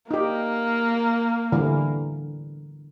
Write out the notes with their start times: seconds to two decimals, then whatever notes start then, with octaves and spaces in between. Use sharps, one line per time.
0.11 A#3 D#4 G4
1.52 D3 E3 G3